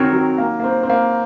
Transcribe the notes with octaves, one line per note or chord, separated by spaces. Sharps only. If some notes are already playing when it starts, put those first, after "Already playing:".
Already playing: D#3 C4 F#4 A#4 C#5
F#3
A#3
A#3
C4
C4
A#3